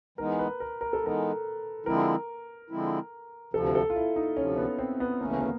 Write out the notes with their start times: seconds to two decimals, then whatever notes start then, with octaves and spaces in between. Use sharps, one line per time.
0.18 E3 G#3 B3 D#4 A#4
0.39 B4
0.60 A#4
0.81 A#4
0.93 A4
1.02 E3 G#3 B3 D#4 A#4
1.86 D3 F3 G#3 C4 E4 A#4
2.70 D3 F3 G#3 C4 E4
3.53 D2 C3 F3 A4
3.75 A4
3.90 F4
3.96 E4
4.16 D#4
4.37 D2 C3 F3 C#4
4.58 B3
4.79 C4
5.00 B3
5.21 D2 C#3 E3 A3 A#3 C#4
5.31 B3
5.41 A#3